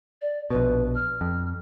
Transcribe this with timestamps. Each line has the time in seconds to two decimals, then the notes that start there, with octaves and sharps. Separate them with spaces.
0.21 D5
0.50 A#1 B2 B4
0.95 F6
1.21 F2